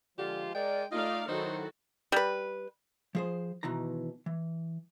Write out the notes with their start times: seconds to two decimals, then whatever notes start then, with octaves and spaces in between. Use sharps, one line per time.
0.18 D3 F3 G#3 F4 G4
0.54 G#3 A#4 D5 G5
0.92 A3 D#4 F4 D5 D#5 F5
1.29 D#3 F#3 D#4 E4 F#4 A4 C5
2.12 G3 B4
3.15 F3 G#4 C5
3.63 B2 D#3 E3 A#5
4.26 E3